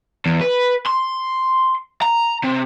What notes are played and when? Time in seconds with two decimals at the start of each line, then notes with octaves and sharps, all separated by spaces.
0.26 E2
0.41 B4
0.87 C6
2.02 A#5
2.44 C3